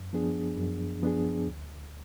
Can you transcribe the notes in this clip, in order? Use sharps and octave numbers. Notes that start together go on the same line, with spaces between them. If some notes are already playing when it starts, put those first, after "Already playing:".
Already playing: F#2
F3 B3 D4 G#4
F#2
F3 B3 D4 G#4
D2